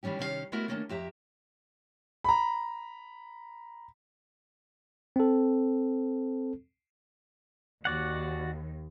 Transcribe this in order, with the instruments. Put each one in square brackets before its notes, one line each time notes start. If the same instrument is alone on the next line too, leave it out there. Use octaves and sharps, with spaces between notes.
[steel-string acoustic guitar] D#3 E3 G3 C#4 G4
C3 D#3 C#4 A#4 F5
G#3 A3 B3 E4 F#4 A#4
D#3 F#3 A3 A#3 C#4 D4
F2 G4 E5 A#5
[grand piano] A#5 B5
[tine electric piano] C4 A4
[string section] D#2 [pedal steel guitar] F#4 D5 F#5